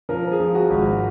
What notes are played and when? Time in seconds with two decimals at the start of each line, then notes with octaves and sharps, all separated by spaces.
0.09 F3 A#4
0.32 G#4
0.40 F3
0.55 F#4
0.70 G#1